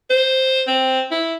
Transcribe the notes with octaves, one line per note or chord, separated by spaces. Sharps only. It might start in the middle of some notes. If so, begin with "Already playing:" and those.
C5
C4
E4